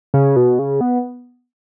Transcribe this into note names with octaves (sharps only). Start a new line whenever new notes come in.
C#3
B2
C#3
B3